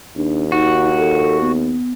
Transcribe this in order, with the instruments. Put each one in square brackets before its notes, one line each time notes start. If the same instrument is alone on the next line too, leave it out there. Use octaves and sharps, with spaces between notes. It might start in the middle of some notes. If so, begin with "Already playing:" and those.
[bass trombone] D#2 [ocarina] D4
[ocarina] D#4 [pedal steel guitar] F#4
[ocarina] A4
B3